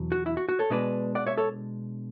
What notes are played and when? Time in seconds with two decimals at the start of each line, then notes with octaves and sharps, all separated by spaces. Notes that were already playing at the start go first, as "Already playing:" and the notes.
Already playing: E2 B2 F#3
0.12 F#4
0.26 E4
0.37 F#4
0.49 F#4
0.59 A4 C#5
0.70 B2 G#3 D4 B4 D5
1.15 D5 F#5
1.26 C#5 E5
1.37 A4 C#5